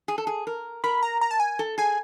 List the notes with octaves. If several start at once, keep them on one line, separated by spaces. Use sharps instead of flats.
G#4
A4
G#4
A#4
A#4 B5
A#5
A#5
A5
G#5
A4
G#4 G#5